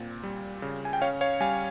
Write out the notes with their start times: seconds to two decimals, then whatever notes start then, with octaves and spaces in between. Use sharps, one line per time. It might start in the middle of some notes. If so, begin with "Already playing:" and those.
Already playing: A#2 C4
0.23 G3
0.62 C#3
0.85 G#5
0.93 G5
1.01 C#4 C#5 F5
1.21 C#5 F5
1.40 G3 F5 G#5